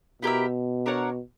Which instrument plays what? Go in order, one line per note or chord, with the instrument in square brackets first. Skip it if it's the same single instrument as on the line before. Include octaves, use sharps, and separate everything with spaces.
[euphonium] B2 [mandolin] E4 G4 A#4 E5
[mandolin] D4 A#4 C#5 F#5